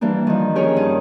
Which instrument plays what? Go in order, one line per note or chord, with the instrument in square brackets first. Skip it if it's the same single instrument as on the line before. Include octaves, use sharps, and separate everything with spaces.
[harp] E3 G3 A#3 D4
D#3 F3
C#4 G4 G#4 A#4 C#5
G2 D#3 D#4 D#6